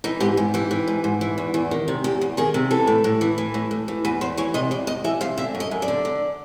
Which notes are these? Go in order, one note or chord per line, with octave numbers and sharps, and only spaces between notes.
E3 D#4
G#2 G4
G#2
E3 G4
E3
G#2
G#2
E3
E2
E2
D#3
C3
E2 G4
E2
D#3 G#4
C3
E3 A4
A2
A2
E3
E3
A2
A2
E3
E2 B4
E2 C5
E3 C#5
C3 D#5
E2 D5
E2 D#5
E3 E5
C3 F5
D3 E5
F#2
D#5
F#2
D5
D3
D3